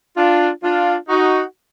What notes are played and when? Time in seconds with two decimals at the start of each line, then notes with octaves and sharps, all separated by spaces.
0.17 D4 F4
0.63 D4 F4
1.09 D#4 F#4